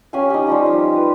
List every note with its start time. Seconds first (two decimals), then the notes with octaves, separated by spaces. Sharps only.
0.13 C#4 G4 F5 G#5
0.30 D#4 G4
0.47 F3 G3 C5
0.66 D#4
0.96 B4